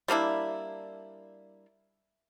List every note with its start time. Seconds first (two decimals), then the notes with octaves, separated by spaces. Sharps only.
0.08 G3 A#3 D4 E4